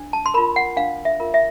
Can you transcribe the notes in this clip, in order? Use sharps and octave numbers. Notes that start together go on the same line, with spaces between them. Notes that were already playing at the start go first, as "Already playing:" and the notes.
Already playing: D4
A5
C6
F4 A#4 B5
F#5
D4 F5
E5
F4 A#4
E5